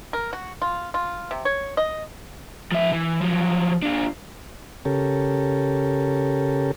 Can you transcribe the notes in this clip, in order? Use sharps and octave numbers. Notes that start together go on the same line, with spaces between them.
A#4
F#4
F4
F4
C3
C#5
D#5
F3 E5
E3
F3 F#3
D4 F4
C#3 C#4 G4 A4 A#4